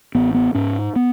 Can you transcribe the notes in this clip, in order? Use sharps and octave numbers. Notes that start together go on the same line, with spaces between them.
A1 B3
B3
G#2 C#4
B3